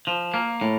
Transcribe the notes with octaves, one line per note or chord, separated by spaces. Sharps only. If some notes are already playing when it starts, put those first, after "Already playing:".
F3
A#3
A2